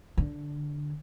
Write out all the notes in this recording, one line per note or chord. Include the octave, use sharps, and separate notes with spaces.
D3